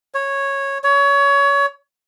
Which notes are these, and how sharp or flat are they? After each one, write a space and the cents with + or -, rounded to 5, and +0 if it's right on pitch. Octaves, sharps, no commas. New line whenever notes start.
C#5 -10
C#5 +25